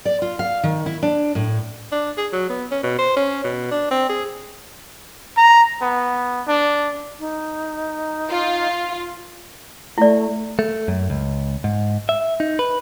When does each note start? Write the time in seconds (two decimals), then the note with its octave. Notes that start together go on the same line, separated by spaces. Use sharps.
0.05 D5
0.22 F4
0.39 F5
0.63 D#3
0.86 E4
1.02 D4
1.35 A2
1.92 D4
2.18 G#4
2.33 F#3
2.50 B3
2.71 C#4
2.83 B2
2.98 C5
3.16 C#4
3.44 B2
3.71 D4
3.91 C4
4.09 G#4
5.37 A#5
5.81 B3
6.47 D4
7.19 D#4
8.29 F4
9.98 A3 E4 D5
10.59 A3
10.88 F#2
11.10 C#2
11.64 G#2
12.09 E5
12.40 D#4
12.59 B4